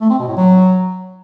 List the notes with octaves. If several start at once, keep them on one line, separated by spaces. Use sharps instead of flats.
A3
C4
B2
A2
F#3